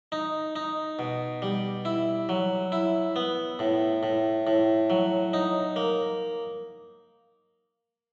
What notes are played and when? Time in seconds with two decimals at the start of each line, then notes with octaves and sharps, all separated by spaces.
0.12 D#4
0.56 D#4
0.99 B2
1.42 G3
1.85 E4
2.29 F#3
2.72 E4
3.16 B3
3.59 A2
4.03 A2
4.47 A2
4.90 F#3
5.33 D#4
5.76 A#3